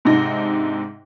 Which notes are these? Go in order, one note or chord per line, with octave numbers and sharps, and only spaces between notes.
G#2 C3 D4 D#4 A#6